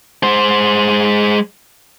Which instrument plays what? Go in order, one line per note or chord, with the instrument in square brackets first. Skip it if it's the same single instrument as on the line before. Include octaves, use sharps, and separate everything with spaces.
[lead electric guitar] G#3 C5